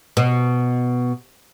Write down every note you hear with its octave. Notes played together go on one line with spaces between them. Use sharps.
B2